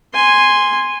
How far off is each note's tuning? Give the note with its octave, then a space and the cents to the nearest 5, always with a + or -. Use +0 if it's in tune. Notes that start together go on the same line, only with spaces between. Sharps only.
G#5 -10 C6 +0